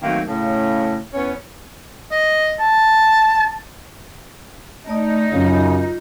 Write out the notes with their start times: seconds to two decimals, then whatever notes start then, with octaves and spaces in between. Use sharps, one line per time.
0.02 D#3 F#3 A3 A#3 C4
0.26 A2 C#3
1.13 E2 B3 C#4
2.12 D#5
2.60 A5
4.87 A3 D#4 D5 D#6
5.32 F#2 C#3 F4